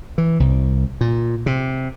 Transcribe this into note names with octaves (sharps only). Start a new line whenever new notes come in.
E3
C2
A#2
C3